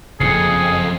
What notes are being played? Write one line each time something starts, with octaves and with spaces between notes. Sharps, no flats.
F#1 C2 F2 G#4 C7 C#7